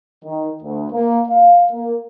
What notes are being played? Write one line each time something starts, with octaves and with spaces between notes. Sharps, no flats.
D#3
D2
A#3
F5
A#3